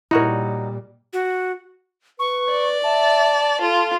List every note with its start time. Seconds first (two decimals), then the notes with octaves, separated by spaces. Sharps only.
0.11 A#2 G3 D#4 E4 F#4 A#4 C#5
1.13 F#4
2.19 B4 C#6
2.51 D5
2.83 E5 A5
3.61 F4 A4